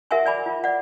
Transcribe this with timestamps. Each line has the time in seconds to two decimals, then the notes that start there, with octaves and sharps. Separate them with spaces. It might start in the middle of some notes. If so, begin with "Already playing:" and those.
0.11 F#4 A#4 E5 F#5 G#5 C#6
0.26 D5 G#5 B5 D6
0.46 F4
0.64 D5 F#5